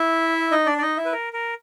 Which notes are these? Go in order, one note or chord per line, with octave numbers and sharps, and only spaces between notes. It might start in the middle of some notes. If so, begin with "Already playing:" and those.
Already playing: E4 E5
D#4 D#5
D4 D5
D5
D#4 D#5
E4 E5
B4
A#4
A#4